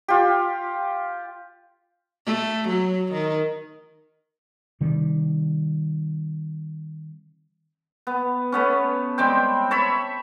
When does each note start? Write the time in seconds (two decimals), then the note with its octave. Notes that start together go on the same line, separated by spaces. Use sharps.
0.08 F4 G4
2.26 A3
2.69 F#3
3.13 D#3
4.81 C3 D#3 G3
8.07 B3
8.52 A3 B3 C#4
9.18 G3 G#3 C4 G5
9.71 A4 C#5 E5 B5